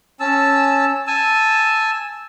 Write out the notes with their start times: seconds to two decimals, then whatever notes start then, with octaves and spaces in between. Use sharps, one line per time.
0.20 C#4 A5 E6
1.07 G#5 A5 E6